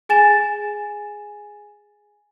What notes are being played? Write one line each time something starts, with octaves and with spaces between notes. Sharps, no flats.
G#4 G#5 A6 E7